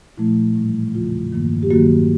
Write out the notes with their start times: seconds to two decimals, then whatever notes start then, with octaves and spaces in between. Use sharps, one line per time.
0.17 A#2 F3 A3 E4
0.56 A2 E3 G3
0.94 E2 C#3 F3 F4
1.32 G2 D#3 F#3 A#3
1.63 G4
1.70 G2 D#3 F#3 A#3 F#4